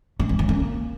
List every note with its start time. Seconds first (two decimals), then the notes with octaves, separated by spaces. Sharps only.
0.19 A3
0.29 G#3
0.39 C#4
0.49 A#3